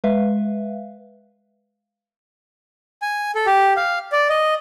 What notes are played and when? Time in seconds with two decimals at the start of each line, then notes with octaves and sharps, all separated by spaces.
0.04 G#3 B4 E5 F5
3.02 G#5
3.35 A4
3.46 G4
3.77 F5
4.12 D5
4.29 D#5